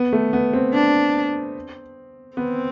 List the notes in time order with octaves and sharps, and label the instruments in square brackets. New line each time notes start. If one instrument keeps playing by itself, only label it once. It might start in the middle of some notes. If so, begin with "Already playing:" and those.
Already playing: [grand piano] B3
A3
B3
C4
[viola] D4
[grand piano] B3 [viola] C4